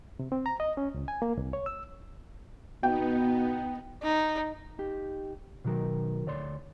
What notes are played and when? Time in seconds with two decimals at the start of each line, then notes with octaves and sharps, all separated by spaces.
0.19 C3
0.32 C4
0.46 A#5
0.60 D#5
0.77 C#4
0.94 C#2
1.08 G#5
1.22 A#3
1.38 C2
1.53 C#5
1.66 E6
2.83 B2 B3 D#4 G5
4.03 D#4
4.79 D#4 G4
5.64 B2 D#3 F#3 A#4 G5
6.26 D2 C#5 D5 C6